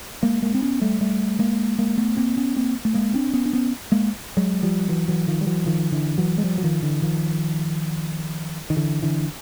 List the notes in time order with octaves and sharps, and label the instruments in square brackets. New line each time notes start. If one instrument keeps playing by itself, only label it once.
[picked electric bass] G#3 A#3
G#3 A#3
C4
B3 C#4
G3 A3
G3 A3
G#3 A#3
G#3 A#3
A3 B3
A#3 C4
B3 C#4
A#3 C4
A3
G#3 A#3
C4 D4
B3 C#4
D4
B3 C#4
G#3 A#3
F#3 G#3
F3 G3
E3 F#3
E3 F#3
D#3 F3
G3
E3 F#3
D#3 F3
D3 E3
E3 F#3
G#3
F3 G3
F#3
D#3 F3
D3 E3
D#3 F3
D#3
D3 E3
D3 E3